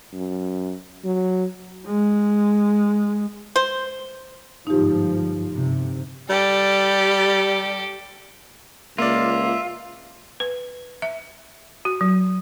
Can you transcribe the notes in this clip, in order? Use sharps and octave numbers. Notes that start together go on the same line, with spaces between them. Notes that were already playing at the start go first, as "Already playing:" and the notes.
F#2
F#3
G#3
C5
G1 G#2 F3 D#4 G4
G1 C3
G3 G4 A4
C#2 A#3 F4 D5 E5
B4
E5
F#4
F#3